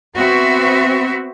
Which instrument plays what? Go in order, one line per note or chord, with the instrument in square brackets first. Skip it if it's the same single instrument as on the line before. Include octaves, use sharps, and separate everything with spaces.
[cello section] B3 C4 F#4 E5